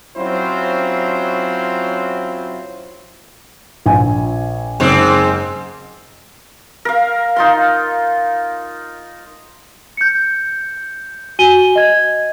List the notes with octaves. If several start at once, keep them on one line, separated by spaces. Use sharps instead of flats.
F#3 C4 C#4 E4 F4 C5
A#1 G#5
F#1 G#2 C4
A#4 F5
D#4 F4 C6
G6 C#7
F#4 G#5 D#7 G7
D#5 G#6